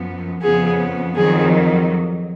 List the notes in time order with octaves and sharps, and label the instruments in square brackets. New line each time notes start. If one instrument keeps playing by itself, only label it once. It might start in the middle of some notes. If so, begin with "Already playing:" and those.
Already playing: [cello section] F#2 F3 B3
[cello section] F2 C#3 F3 B3 [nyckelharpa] G#4
[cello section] F2 D#3 F#3 [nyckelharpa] G#4